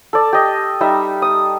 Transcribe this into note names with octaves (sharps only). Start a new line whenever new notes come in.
A4 D5
G4 D#5
G3 D#4 E5
D#6